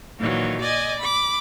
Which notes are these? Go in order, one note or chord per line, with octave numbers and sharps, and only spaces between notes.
A#2 D#3 E3 F#3
D5 D#5 G#5
B5 D6